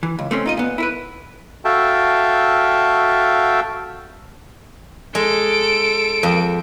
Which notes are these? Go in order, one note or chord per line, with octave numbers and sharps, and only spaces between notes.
E3
C#2
A3 C4 C#4
D#4 F4 D#5
A#2 B3
E4 A#4 B4
F#4 A4 E5 F5 G5 A5
G#3 A4 D7
F2